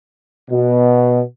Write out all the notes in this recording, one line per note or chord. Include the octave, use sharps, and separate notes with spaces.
B2